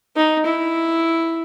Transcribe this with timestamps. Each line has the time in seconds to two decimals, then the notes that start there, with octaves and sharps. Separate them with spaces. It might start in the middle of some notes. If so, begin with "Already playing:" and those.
0.16 D#4
0.46 E4